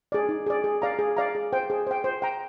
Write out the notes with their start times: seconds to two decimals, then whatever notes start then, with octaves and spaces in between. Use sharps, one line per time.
0.12 G#4 D5
0.29 D#4
0.46 G#4 D5
0.64 G#4
0.82 D5 F5 A#5
0.99 G#4
1.17 D5 F5 A#5
1.35 G#4
1.53 C5 G5
1.70 G#4
1.87 C5 G5
2.04 C5
2.22 G5 A#5